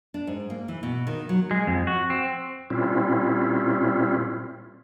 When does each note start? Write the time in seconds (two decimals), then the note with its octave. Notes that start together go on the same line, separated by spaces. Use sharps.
0.14 D4
0.27 G#2
0.50 A#3
0.68 E3
0.83 B2
1.07 D#3
1.29 F#3
1.51 G#3
1.67 F2
1.87 F#4
2.10 C4
2.70 A#2 G3 C4 C#4 E4 F4